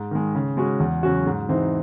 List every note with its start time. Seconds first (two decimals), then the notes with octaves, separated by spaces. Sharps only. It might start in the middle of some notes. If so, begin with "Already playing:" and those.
Already playing: G#2
0.11 D#3 G#3
0.35 C#3
0.57 G#3 C#4 F#4
0.80 E2
1.03 C#3 F#3 C#4 F#4
1.26 G#2
1.49 E3 C4 D#4